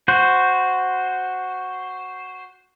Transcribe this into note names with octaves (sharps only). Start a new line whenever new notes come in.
F#4 C5